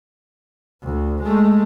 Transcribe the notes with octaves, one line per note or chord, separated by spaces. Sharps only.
D2
G#3 A3